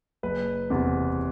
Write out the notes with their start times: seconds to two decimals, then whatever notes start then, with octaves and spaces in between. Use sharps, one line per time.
0.23 F#1 B4
0.70 E2 C3